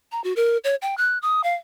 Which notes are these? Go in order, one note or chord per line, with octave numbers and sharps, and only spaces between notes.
A#5
F#4
A#4
C#5
G5
F#6
D#6
F5